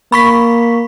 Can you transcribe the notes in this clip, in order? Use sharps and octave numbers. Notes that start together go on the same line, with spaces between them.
A#3 B5 C#6 B6